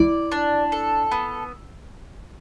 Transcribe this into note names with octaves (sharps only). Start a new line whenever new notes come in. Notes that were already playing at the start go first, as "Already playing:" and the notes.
Already playing: E4 D5
D4
A4
B3